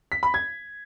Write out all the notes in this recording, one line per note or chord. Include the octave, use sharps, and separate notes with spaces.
B6
B5
G#6